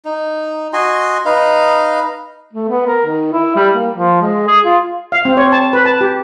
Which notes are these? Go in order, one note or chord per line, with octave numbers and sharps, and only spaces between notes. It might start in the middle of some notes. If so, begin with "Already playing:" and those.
D#4
F#4 D#5 G#5 C6
D#4 B4 D#5 F5
A3
B3
A#4
D#3
E4
G3
A#3
F3
G#3
G#4
F4
F5
C4
C#5
A5
B4
A5
G4